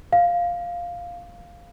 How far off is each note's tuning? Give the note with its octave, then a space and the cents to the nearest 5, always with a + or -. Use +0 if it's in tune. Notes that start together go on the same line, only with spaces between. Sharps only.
F5 +0